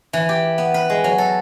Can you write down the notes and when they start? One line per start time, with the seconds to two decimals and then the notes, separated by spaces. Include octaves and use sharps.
0.13 E3
0.29 G4
0.58 B3
0.74 B4
0.90 G#3
1.04 F#3
1.18 A4